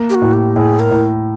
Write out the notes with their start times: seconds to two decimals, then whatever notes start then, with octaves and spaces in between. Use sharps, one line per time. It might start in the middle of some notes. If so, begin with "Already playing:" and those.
Already playing: A#3
0.10 G4
0.15 F#4
0.22 A2
0.33 G4
0.56 A2 G#4
0.79 A#4
0.91 A2